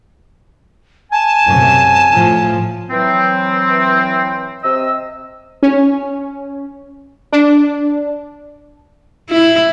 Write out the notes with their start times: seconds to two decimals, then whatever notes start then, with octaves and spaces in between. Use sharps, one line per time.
1.12 G#5 A5
1.45 F#2 C3
2.11 A2 F3
2.90 E3 F#3 C4
4.63 C3 D#5 E6
5.63 C#4
7.33 D4
9.30 E4